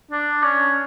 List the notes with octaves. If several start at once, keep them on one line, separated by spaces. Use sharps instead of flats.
D4
C#4